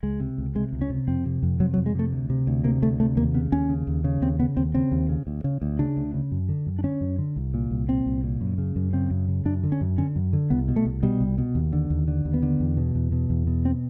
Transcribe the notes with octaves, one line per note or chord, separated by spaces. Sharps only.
C#2 G#3
C3
C#2
C3 G#3
C#2
C#4
C3
F2 C4
C3
F2
C3 F#3
F#3
F2
G#3
C3 A3
D2
C3
D2
C3 A#3
D2 A3
C3 A3
D#2 A#3
C#3 B3
D#2 C#4
C#3
D#2
C#3
D#2 C4
C#3 B3
D#2 C4
C#3 C4
D#2
C#3
D2
C#3
D2
C#3 D4
D2
C#3
F#2
D3
F#2
D4
D3 C#4
F#2
D3
C2
A#2
C2
A#2 C4
C2
A#2
F#2
C#3
F#2
C#3 C4
F#2
C#3
F#2 D4
D3
C#4
F#2
D3 C#4
F#2
D3
C2 B3
B2
A3
C2
B2 G3
C2
B2
D#2
D3
D#2
D3
D#2
B3
D3
E2
B2
E2
B2
E2
B2
C4